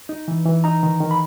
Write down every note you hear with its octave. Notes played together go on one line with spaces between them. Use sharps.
D#4
E3
E3
D#4 A#5
D#3
D#3
B5